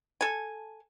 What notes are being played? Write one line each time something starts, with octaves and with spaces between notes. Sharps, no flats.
A4 G#5